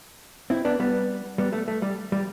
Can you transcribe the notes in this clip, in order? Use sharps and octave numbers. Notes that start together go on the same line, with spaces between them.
C4 E4
B3 D4
G3 B3
G3 B3
A3
A3
G3
G3